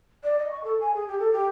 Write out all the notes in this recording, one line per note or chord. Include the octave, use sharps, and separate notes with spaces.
D5
D#5
C#6
A4
G#5
G#4
G4
A4
G4